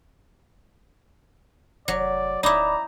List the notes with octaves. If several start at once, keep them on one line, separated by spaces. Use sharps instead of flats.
F1 F#3 D5
D1 D#4 E4 D5 A#5 B5 D6